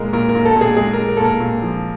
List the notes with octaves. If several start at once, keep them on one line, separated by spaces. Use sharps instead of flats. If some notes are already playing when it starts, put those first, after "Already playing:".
Already playing: A#2 G#3 A#4
A#2 A#4
A#4
A#2
A4
A#2 G#4
G#3 G#4
A#4
G#3
A#4
A4
A#2 A#4
A#2
F3